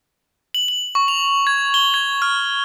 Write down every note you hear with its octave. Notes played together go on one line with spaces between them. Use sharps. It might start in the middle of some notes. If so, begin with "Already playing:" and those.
F#7
F#7
C#6
F7
G#6
G7
G#6
F6